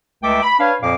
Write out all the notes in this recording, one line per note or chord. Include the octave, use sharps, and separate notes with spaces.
C#2 A3 E5 G5 D6
B5
D4 B4 C#5 F5
F2 A#2 F3 F5 D6